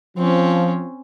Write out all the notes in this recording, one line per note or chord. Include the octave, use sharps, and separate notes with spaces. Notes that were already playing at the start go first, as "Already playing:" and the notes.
F3 C4 C#4